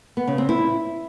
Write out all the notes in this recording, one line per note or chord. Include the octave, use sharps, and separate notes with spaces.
B3
C#3
C4
E4